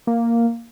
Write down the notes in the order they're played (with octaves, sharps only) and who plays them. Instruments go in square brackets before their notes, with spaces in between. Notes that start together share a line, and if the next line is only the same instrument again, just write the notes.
[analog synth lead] A#3